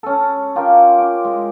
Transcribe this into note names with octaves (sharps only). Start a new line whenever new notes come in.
C#4 A4
F4 G4 A#4
D6
G#3